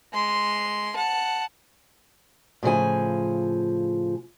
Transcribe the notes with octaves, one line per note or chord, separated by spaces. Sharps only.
G#3 C6
F#5 A5
A2 C#3 F3 G#5